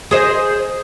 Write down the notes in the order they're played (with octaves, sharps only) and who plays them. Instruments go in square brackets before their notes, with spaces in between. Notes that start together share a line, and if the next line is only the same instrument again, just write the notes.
[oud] G#4 C5 D#5